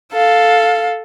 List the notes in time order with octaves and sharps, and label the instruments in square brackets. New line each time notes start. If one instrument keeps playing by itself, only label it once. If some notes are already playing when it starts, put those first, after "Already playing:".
[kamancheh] A4 F5